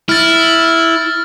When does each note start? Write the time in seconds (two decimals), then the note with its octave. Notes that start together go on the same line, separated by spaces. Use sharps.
0.09 E4 F6 A6